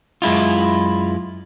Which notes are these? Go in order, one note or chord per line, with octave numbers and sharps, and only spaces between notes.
F#2 G#3 E4 F4